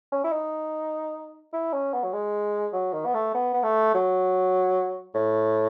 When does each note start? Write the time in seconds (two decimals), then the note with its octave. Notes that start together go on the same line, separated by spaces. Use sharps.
0.12 C#4
0.24 E4
0.32 D#4
1.53 E4
1.73 C#4
1.93 B3
2.04 F#3
2.13 G#3
2.73 F#3
2.93 D#3
3.06 B3
3.14 A3
3.34 B3
3.53 B3
3.63 A3
3.94 F#3
5.15 A2